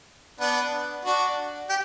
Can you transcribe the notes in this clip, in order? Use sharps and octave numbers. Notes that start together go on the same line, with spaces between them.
B3 D4
D4 F#4
G4